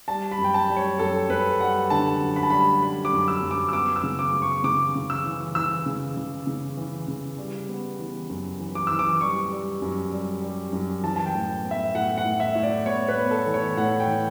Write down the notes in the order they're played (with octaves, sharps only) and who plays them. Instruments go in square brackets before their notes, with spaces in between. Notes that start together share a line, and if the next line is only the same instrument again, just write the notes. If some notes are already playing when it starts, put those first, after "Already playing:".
[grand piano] G3 A5
B5
F#2
G5
A5
G3
C#5
F#2 A4
F#2 B4
G3 F#5
D3 A5
F#2
B5
A5
G3 B5
G3 B5
D6
F#2
E6
F#2
D6
E6
B3 D6
E6
C#3
D6
C#3
C#6
C#3 D6
C#3
E6
E3
E3 E6
C#3
C#3
C#3
E3
C#3
G3
B3
E3
F#2
E3
D6
E3 E6
D6
G3 C#6
G3
F#2
G3
G3
F#2
E3 A5
A5
G5
A2
B3
E5
A2 F#5
F#5
A2
E5
A2
D5
B3 C#5
B4
B3
A4
E3
C#5
A2 F#5
G5
E3